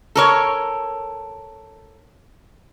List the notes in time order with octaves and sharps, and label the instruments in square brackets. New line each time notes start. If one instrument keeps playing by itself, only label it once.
[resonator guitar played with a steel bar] A4 A#4 C#5